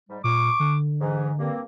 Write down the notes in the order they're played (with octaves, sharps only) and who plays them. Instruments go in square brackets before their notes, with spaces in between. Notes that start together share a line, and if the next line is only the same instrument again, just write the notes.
[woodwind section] G#2 G3
[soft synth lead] A#2 [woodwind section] C#6 D6
[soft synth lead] D3
[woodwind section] G#2 E3
G2 A#3 C4